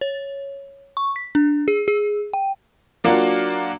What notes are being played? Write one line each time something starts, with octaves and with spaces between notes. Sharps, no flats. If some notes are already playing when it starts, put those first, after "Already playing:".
C#5
C#6
B6
D4
G#4
G#4
G5
F#3 A#3 D4 F4 F#4